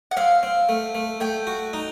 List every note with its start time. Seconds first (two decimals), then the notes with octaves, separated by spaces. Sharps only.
0.11 F#5
0.17 C4 F5
0.43 C4
0.69 A3
0.95 A3
1.20 A3 G5
1.47 F#4
1.73 D#4